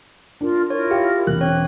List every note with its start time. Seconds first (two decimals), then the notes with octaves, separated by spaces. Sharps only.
0.41 D4 F4 A#4
0.70 E4 F4 A#4 C#5
0.91 G4 F5
1.27 E1 F#6
1.41 C4 C#5 F#6